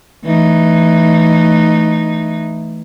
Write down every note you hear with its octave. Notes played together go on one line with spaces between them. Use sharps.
E3 A3 D#4